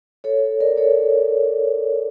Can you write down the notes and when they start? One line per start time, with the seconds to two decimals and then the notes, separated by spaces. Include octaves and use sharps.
0.24 A4 C#5
0.60 A#4 D5
0.77 A4 C#5